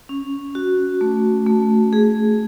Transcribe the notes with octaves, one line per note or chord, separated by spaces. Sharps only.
C#4
F#4
A3
A3
G#4